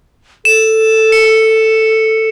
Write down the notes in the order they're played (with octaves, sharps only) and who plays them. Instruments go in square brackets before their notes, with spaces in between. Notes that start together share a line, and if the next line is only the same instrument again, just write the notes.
[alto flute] A4 [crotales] E7
[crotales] C#7